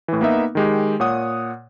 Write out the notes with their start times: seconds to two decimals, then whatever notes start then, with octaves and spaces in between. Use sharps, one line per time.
0.08 A2 E3
0.21 A#3 B3 D#4 E5
0.55 D#3 G#3 G4
1.00 A#2 C#5 F#5 D#6